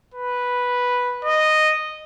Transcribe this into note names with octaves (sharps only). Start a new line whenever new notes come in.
B4
D#5